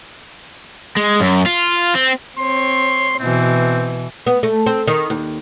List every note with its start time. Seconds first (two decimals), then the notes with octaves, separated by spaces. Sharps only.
0.96 G#3
1.20 F#2
1.46 F4
1.95 C4
2.38 C4 C#5 C6
3.19 B2 E3 C4
4.27 B3
4.43 A3
4.66 C4
4.87 D#3
5.10 D#2